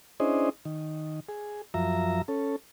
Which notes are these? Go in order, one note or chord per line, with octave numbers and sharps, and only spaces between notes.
C#4 D4 E4 G#4 C5 D#5
D#3
G#4
F#2 F3 E5 A#5
C#4 A4